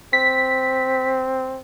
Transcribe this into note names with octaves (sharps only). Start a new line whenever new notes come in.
C4 B6